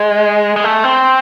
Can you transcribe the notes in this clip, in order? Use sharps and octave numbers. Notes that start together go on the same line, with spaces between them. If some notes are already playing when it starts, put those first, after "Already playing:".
Already playing: G#3
G#3
A3
C4